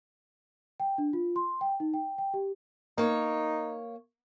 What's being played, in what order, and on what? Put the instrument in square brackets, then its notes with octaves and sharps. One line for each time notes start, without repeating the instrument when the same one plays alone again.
[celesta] G5
D4
F4
C6
G5
D#4
G5
G5
G4
[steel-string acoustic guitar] A#3 C#5 [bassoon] D#4